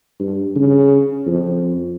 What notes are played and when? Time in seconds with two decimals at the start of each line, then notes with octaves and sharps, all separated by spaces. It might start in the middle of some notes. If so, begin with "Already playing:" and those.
0.20 G2
0.56 C#3
1.26 F2